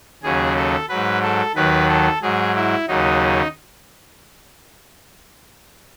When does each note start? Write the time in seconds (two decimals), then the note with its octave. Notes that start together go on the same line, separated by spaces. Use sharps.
0.23 D#2 C#3 F#3 G#4
0.56 A4
0.89 G#2 F#3 B4
1.22 A4
1.55 D#2 D#3 F#3 B4
1.89 A4
2.22 G#2 F#3 G#4
2.55 E4
2.88 D#2 C#3 F#3 D#4